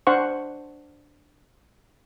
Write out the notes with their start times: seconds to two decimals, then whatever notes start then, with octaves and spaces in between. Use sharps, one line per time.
0.07 D4 C5 F#5 C#6